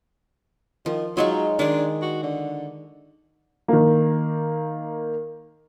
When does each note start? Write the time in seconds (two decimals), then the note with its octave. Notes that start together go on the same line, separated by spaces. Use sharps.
0.86 D#3 F3
1.17 F#3 G#3 D#4 F4
1.59 D#3 D4 G#4
2.02 F#4
2.23 D3
3.68 D#3 A#3